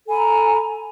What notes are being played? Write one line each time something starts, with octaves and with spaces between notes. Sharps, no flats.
A4 G#5 A#5 B5